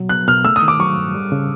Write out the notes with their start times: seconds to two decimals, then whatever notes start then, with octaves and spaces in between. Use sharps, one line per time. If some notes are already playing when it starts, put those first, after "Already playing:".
Already playing: B2 F#3
0.09 B3 F#6
0.28 B2 F6
0.45 A3 E6
0.56 D#6
0.63 D#3
0.68 D6
0.80 F#3 C#6
0.97 G2
1.14 G3
1.32 C#3